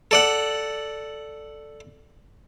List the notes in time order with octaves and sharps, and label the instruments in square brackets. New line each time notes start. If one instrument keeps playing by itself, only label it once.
[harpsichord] A4 D5 F#5